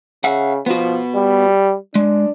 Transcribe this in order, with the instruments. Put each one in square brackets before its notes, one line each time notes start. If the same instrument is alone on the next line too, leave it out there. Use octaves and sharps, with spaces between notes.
[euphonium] C#3 [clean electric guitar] E5 F#5
[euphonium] F3 [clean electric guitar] B3 F#4
[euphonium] G3
[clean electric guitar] G#3 [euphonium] D4